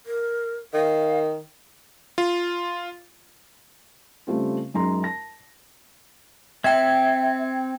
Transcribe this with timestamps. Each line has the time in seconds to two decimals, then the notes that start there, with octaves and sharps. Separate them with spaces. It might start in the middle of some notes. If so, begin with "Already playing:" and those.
0.06 A#4
0.74 D#3 F5
2.18 F4
4.27 C#3 G3 A3 C4 F4
4.74 F#2 G#3 D#4 A#5 C6
5.03 A5 A#6
6.64 C4 E5 G5 G#6